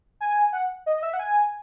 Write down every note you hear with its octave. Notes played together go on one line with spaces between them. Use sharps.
G#5
F#5
D#5
D#5
E5
F#5
G#5